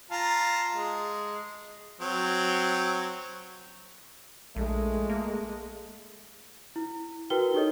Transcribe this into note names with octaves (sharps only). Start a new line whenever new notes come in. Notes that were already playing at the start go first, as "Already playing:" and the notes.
F4 A5 A#5
G#3
F#3 C4
A#1 G#3 A3
A#3
E4
E4 F#4 A#4 B4 G5 G7
D#4 G4 A4 C#5 D#5